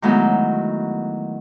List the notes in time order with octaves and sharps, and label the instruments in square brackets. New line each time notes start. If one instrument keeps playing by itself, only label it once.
[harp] D#3 E3 F#3 G#3 A3 B3